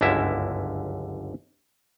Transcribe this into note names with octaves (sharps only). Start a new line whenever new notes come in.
G1 C#2 F#2 D3 E4 E5